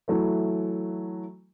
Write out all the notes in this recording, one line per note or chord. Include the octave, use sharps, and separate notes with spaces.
E3 F#3 A3